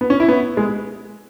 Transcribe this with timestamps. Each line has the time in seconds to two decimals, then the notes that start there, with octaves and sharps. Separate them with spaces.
0.01 B3
0.10 C#4
0.20 E4
0.28 B3
0.57 G#3